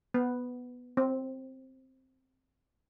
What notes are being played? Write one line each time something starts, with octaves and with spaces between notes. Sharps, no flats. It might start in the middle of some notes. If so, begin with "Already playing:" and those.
B3
C4